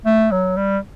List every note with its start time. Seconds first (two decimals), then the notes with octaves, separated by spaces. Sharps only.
0.05 A3
0.31 F#3
0.57 G3